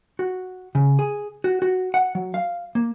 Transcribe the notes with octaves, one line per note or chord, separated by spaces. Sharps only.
F#4
C#3
G#4
F#4
F#4
F#5
F#3
F5
A#3